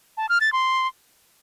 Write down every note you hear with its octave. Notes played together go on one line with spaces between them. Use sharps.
A5
F6
A6
C6